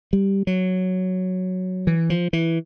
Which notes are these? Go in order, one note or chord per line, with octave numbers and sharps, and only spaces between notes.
G3
F#3
E3
F3
E3